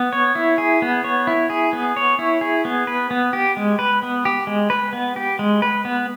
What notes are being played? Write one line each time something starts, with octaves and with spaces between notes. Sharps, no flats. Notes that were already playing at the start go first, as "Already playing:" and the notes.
Already playing: B3
C#5
E4
G#4
B3
C#5
E4
G#4
B3
C#5
E4
G#4
B3
B4
B3
G4
G#3
B4
B3
G4
G#3
B4
B3
G4
G#3
B4
B3